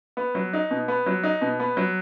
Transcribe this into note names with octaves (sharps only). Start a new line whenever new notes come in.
B3
F#3
D#4
B2
B3
F#3
D#4
B2
B3
F#3